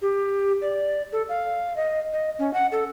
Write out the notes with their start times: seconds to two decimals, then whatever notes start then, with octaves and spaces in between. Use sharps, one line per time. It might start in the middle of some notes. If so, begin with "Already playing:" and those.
0.02 G4
0.62 D5
1.12 A4
1.29 F5
1.76 D#5
2.13 D#5
2.39 C#4
2.54 F#5
2.72 A4